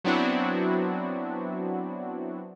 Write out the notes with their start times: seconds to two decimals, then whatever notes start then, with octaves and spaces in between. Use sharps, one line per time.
0.04 F#3 B3 C4 D4 E4 F#4